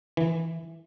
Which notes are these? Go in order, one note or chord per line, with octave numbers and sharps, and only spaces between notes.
E3